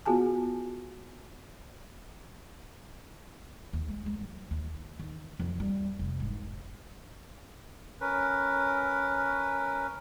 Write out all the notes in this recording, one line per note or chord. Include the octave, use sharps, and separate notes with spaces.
B3 F4 F#4 G#4 G#5 A5
D#2
G#3
G#3
F#3
D#2
D#3
F2
G3
F1
G#2
C#4 A#4 B4